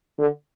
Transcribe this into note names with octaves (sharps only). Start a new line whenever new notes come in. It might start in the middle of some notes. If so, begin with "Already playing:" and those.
D3